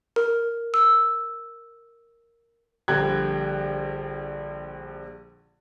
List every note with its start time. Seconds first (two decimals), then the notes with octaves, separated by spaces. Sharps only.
0.16 A#4
0.74 E6
2.88 A#1 D3 G3 G5 F#6 G#6